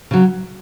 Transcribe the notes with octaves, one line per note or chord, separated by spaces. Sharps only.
C#3 F#3